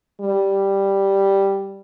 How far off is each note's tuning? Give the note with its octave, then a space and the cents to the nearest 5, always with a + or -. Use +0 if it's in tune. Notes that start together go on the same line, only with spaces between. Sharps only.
G3 +0